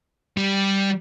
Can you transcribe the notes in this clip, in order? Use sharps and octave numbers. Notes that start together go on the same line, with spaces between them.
G3